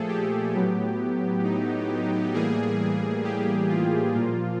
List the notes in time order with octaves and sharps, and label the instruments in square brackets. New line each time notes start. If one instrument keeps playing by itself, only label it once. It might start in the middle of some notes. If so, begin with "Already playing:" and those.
Already playing: [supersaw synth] A#2 F3 A3 G#4 A4
G4
A2 F#3 B3 G4
D#4
A2 E3 G3 A#3 G#4
G4
F4
A#2 F3 A#3 F4